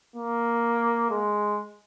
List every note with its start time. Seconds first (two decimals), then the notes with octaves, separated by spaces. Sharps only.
0.16 A#3
1.10 G#3